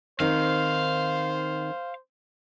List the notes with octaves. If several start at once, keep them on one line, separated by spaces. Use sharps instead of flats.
D#3 C4 D#4 C5 F5